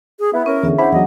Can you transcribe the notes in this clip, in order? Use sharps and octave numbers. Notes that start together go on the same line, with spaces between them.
G#4
B3 E4
C#4 A#4 C#5
E2 D3 G#4 E5
D4 E4 C5 F#5 A5 B5
E2 F#3 D#5 F#5